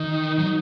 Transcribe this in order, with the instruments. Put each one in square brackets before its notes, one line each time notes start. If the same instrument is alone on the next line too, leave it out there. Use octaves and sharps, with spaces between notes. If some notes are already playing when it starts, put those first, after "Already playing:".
Already playing: [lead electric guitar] D#3 [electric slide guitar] D#4
[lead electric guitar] F#3